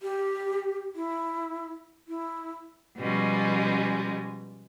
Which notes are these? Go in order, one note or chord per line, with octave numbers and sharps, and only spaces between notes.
G4
E4
E4
B2 F3 G3 G#3 C#4